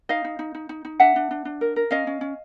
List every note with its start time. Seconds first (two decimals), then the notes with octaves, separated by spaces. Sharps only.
0.09 D#4 D#5 F5
0.24 D#4
0.39 D#4
0.55 D#4
0.69 D#4
0.85 D#4
1.00 D4 E5 F#5
1.16 D4
1.31 D4
1.45 D4
1.61 A#4
1.76 A#4
1.91 C#4 D#5 F5
2.07 C#4
2.21 C#4